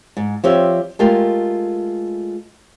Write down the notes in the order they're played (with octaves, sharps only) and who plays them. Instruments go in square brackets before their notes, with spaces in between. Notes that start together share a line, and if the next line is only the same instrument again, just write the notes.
[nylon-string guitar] G#2
F3 C4 G4 C#5 D5 E5
G#3 A3 F4 G4 A#4